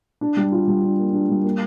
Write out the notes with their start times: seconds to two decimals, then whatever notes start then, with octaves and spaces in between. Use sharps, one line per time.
0.21 D4
0.37 G3
0.52 F4
0.68 G3
0.83 D4
0.99 A#3
1.13 D4
1.29 G3
1.44 A#3